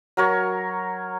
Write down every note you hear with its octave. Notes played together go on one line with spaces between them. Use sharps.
F#3 A#4 C#5